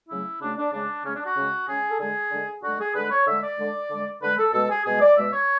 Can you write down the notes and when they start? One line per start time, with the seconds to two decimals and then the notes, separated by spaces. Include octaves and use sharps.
0.09 C#3 F#3 A3 E4
0.41 C#3 F#3 A3 D4
0.57 D4
0.73 C#3 G#3 D4
1.05 C#3 G#3 C#4
1.15 D4
1.26 F#4
1.36 C#3 G#3
1.68 C#3 G#3 G#4
1.89 A4
2.00 D3 G#3 G#4
2.32 D3 G#3
2.63 D3 G#3 F#4
2.80 G#4
2.95 D3 G#3 B4
3.11 C#5
3.27 D3 G#3 E5
3.43 D5
3.59 D3 G#3
3.90 D3 G#3
4.22 D3 G#3 B4
4.38 A4
4.54 B2 G#3 A4
4.70 G#4
4.86 B2 G#3 G#4
5.01 D5
5.17 B2 G#3 E5
5.33 C#5